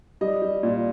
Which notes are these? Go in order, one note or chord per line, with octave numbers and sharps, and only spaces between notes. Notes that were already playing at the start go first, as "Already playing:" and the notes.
G3 D#5
G3
A#2